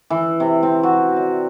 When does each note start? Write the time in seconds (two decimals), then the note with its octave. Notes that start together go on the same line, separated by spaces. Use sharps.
0.10 E3
0.40 C3
0.63 C4
0.83 F#4
1.16 D5